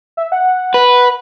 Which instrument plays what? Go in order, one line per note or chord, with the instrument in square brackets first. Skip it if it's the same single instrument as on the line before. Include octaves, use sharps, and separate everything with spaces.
[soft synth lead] E5
F#5
[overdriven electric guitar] B4